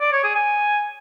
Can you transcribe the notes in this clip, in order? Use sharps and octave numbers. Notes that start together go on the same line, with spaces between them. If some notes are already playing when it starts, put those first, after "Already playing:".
D5
C#5
G#4
G#5